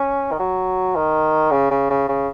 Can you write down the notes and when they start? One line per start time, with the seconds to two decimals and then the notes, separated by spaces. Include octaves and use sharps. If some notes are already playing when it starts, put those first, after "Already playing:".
Already playing: C#4
0.31 D#3
0.39 F#3
0.96 D#3
1.51 C#3
1.71 C#3
1.90 C#3
2.08 C#3